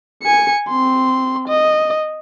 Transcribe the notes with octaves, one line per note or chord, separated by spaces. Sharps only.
G#5 C#7
C4 C6
D#5